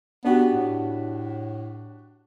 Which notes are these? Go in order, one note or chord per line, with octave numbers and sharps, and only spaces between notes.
B3 D4 F#4 G4
A2